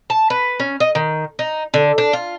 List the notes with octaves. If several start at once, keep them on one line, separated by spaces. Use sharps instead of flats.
A5
B4
C#4
D#5
D#3
D#4
D3
D4
F4